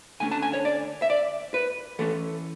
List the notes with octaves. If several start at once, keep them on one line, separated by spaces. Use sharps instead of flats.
D3 A3 C#4 G#5
A5
G#5
C#5
D5
E5
D5
B4
E3 A3 C#4 A4